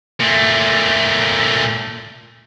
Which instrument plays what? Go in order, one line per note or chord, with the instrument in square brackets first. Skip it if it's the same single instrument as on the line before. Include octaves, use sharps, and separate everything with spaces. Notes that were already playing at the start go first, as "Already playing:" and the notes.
[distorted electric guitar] A#2 A3